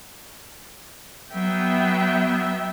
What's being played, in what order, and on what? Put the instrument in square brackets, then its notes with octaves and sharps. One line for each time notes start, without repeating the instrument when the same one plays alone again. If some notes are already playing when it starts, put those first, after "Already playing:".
[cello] F#3 [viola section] B3 E5 G5